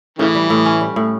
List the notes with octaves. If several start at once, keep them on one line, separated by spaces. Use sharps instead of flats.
A2 C#3 E3
G3
A2
C#4
G3
A2